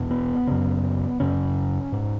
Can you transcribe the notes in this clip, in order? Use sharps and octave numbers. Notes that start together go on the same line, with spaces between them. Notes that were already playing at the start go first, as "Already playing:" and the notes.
Already playing: E2 B2
B3
F#2 C#3
F#2 C#3 C#4
G#2